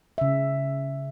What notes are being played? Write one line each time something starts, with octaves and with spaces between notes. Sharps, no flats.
C#3 E5